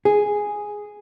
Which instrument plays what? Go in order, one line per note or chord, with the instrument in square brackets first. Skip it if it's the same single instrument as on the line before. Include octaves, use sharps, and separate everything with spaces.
[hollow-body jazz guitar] G#4